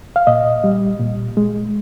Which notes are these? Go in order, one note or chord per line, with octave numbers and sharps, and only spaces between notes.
F5
A#2 D#5
G3
A#2
G#3